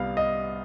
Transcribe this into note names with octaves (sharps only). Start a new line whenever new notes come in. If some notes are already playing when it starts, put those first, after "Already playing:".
Already playing: C2 G3 B3 F5
D#5